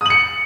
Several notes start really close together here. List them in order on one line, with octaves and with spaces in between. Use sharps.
D#6 F#7 C#7